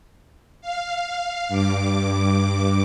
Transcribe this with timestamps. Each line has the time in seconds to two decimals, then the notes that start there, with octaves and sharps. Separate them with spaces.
0.61 F5
1.48 G2 D6